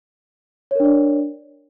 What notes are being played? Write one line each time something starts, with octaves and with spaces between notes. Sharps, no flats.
D4 A#4 C#5 D5